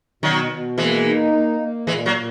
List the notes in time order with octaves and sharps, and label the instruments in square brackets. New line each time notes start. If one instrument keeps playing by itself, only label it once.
[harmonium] B2 [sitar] D#3 F#3
[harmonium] B2
[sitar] E3 G#3 [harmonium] A#3
[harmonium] D#4
A#3
A#3
[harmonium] A#2 [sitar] E3 G#3
[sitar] F#3 A#3
[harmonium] A#2